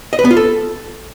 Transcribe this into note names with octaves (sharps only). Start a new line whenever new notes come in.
D#5
B4
B3
F4
A4